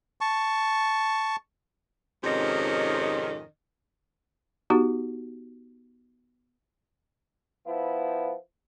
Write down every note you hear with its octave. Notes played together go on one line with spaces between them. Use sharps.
A5 C#6
F2 G#2 C3 D#3 C#4 D#5
B3 D#4 F#4 G4
F3 B3 E4